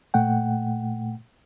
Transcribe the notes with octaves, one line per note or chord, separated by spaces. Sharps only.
A#2 A3 F#5 G5